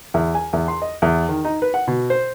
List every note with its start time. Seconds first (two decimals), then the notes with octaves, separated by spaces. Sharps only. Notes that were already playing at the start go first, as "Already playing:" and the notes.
0.14 E2
0.35 G#5
0.53 E2
0.68 C6
0.82 D#5
1.02 E2
1.29 D#3
1.45 D#4
1.62 B4
1.74 F#5
1.88 B2
2.10 C5